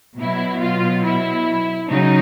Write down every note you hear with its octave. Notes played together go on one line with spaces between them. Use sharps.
B2 F#3 E4
F4
E4
C#3 F#3 D#4